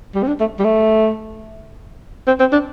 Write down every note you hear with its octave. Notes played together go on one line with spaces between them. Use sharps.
G3
C4
D4
A3
G3
A3
C4
C4
D4